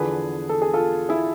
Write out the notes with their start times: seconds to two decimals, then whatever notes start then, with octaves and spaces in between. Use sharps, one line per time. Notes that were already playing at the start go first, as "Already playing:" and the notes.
Already playing: E2 D3 F3 G#4 B4
0.49 A4
0.62 G#4
0.73 F4 A4
1.09 E4 G#4